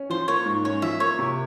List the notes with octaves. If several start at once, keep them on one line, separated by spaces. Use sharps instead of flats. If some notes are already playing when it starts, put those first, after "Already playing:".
Already playing: C#4
F3 C5
A#3 C#5
G#2
C#4 C#5
F3 E5
A#3 C#5
C3